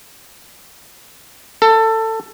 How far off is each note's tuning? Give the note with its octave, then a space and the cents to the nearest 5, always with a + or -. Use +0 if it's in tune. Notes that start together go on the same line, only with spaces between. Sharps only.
A4 +20